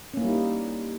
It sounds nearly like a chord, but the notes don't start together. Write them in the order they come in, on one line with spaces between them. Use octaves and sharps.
C#4 A#3 E4 G3 D#4